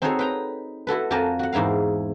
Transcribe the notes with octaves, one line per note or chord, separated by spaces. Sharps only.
C4 D#4 F#4 G#4 A4 C#5
B4 G5 A#5
E4 F#4 A4 B4
F2 F3 F#4 A#4 G#5 A5
F#4 F#5
E2 G#2 E4 A#4 F5